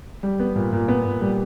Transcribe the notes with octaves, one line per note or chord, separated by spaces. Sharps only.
G3
B3
A#2
A#2
B3
A#2
G3